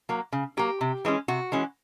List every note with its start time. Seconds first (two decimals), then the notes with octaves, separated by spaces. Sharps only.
0.09 F#3 A#3
0.32 C#3
0.57 F#3 A#3 G4
0.81 C3
1.05 E3 G#3 C#4
1.28 C3 F#4
1.52 E3 G#3 C#4